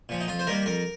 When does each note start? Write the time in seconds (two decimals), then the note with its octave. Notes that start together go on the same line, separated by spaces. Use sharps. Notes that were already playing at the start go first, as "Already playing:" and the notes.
0.09 A#2 F3
0.21 D#4
0.28 F2 F4
0.39 C5
0.47 D#3 G3 A#3 A#4
0.66 F2 A#4